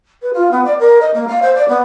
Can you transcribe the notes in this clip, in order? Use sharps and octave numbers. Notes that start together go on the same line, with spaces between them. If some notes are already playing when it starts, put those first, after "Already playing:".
B4
F4
B3
D5
A#4
D#5
A#3
F5
C5
D5
B3